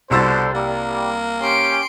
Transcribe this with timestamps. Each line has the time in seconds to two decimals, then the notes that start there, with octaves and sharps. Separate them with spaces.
0.11 C2 B2 D3 C5 E6 A6
0.54 G3 A#3
1.41 C#4 G4 C6 D7